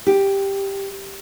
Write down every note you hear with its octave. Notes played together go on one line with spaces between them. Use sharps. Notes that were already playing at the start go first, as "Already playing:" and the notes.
G4